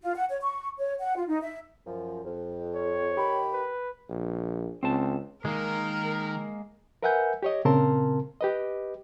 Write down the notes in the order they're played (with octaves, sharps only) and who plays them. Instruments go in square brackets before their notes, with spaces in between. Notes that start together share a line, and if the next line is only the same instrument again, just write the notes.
[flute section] F4
F#5
C#5
C#6
C#5
F#5
F4
D#4
E5
[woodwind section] F#2 F3
F2
[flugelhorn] C#5
[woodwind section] D#3 G4 B5
[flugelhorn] B4
[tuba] A#1
[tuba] C#2 [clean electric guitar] C4 A5
[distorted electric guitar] D#3 [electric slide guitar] G#3 A#3 [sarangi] A#4
[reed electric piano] A#4 B4 E5 F#5 G#5 G6
G4 C#5 D#5
A#2 C#3 C4 A#4 A5 C6
G4 B4 D#5